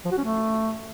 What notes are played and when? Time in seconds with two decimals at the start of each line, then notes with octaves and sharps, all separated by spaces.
0.05 F3
0.11 F#4
0.18 C#4
0.24 A3